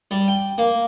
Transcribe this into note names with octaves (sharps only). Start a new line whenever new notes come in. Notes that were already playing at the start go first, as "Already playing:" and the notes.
G3
G5
A#3